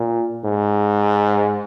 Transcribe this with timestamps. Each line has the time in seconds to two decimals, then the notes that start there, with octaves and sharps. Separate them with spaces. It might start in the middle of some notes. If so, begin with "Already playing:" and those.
Already playing: A#2
0.44 G#2